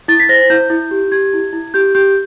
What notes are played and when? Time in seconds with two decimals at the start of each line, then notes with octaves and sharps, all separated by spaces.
0.08 E4 A6
0.20 B6
0.29 C5 A#6
0.50 E4 G6
0.70 E4
0.91 G4
1.12 G4 G#6
1.33 E4
1.53 E4
1.74 G4 G6
1.95 G4 G6